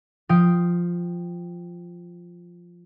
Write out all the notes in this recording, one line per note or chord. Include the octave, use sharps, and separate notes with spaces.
F3 F5 G5 D#6 D7